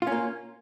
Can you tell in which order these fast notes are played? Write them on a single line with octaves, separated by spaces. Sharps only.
F4 C#4 A#3